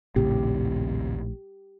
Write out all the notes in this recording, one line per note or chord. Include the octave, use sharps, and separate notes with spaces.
A#1 D#2 A2 C#3 C4 G4